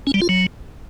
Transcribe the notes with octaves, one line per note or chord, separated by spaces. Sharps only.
C#4
G3
F4
F#3